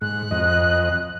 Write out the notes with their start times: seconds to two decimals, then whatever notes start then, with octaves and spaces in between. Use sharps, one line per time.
0.01 G#2 F#6
0.31 F2 D#5